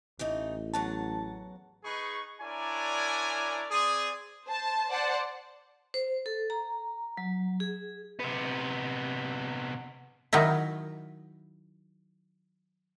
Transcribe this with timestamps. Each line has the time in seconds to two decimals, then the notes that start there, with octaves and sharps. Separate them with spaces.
0.19 A1 E3 A3 D#4
0.74 E2 F#3 F#5 A5
1.84 D#4 G#4 B4 C#6
2.41 D4 E4 A#4 C#5 D5 G#5
3.71 C4 G#4 D5 G#5 D#6
4.46 C5 A5
4.90 C5 D5 F#5 A5
5.94 C5
6.26 A4
6.50 A#5
7.17 F#3
7.60 G#4
8.20 C3 B3
10.33 D#3 F#3 D#4 E4